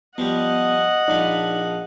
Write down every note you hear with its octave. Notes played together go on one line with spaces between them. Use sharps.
F3 G3 B3 D#5 F#5
A#1 F3 D#4 D5 B5